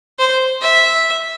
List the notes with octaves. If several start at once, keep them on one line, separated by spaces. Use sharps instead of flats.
C5
E5